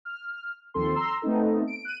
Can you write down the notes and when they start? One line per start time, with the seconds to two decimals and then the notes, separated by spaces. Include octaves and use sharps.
0.05 F6
0.74 D#2 F3 C4 A4 C6
0.95 A#5 C6 E6
1.22 A3 B3 C4 D#4 A4
1.67 D7
1.85 F#6 D#7